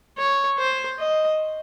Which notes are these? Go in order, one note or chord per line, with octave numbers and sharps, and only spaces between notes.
C#5
C5
D#5